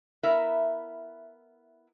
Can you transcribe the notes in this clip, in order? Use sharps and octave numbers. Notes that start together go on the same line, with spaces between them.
B3 E4 A#4 E5